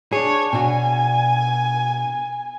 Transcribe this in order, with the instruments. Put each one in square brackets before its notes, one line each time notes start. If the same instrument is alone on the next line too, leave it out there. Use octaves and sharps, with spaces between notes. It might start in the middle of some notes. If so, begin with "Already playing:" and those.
[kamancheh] D4 C#5 [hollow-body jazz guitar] G#4
[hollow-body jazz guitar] B2 D4 F#4 [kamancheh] G#5